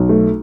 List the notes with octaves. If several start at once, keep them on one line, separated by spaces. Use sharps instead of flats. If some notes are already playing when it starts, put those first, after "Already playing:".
Already playing: B1
A3